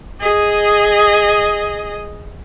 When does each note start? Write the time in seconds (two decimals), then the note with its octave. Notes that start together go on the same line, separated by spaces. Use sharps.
0.21 G#4 D#5